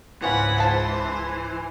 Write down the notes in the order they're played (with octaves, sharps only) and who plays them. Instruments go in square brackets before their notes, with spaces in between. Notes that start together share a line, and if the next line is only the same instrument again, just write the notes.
[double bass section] C#2 G#2 [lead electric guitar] E3 [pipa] B3 C#4 F4 [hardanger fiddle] F#5 B5
[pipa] F4 A5 [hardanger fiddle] C5